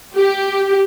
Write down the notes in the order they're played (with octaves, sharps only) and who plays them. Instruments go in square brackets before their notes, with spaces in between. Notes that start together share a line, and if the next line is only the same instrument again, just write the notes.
[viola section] G4